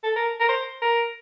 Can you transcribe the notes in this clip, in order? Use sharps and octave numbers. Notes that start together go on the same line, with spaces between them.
A4
A#4
A#4
C5
A#4